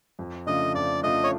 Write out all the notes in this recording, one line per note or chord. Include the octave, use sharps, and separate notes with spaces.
F2
C#3 F3 A3 D4 D#5
F2 D5
C#3 F3 A3 D4 D#5
C#5